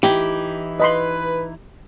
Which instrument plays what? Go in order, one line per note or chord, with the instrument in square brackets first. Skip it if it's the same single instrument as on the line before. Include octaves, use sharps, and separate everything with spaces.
[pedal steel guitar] E3 D#4 E4 [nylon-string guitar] G4
[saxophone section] B4 [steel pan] D#5 B5 C6